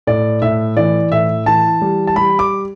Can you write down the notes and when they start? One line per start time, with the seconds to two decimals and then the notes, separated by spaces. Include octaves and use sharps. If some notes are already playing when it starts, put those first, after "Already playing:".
0.07 A2 D5
0.42 A2 E5
0.77 E3 D5
1.11 A2 E5
1.46 E3 A5
1.81 G3
2.07 A5
2.16 G3 B5
2.39 D6